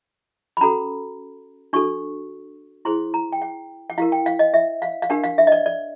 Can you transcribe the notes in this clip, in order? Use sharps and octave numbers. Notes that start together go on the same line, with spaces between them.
B5
C#4 F#4 A4 A#5
D4 F#4 A4 C#6
E4 G#4 C5 C6
A#5
G5
F#5
F#5
E4 G4 A#4 F5
G5
F5
D#5
E5
F5
F5
D4 G4 A#4 F#5
F5
E5
D#5
D5
D5